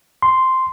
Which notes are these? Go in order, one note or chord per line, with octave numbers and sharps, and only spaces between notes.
C6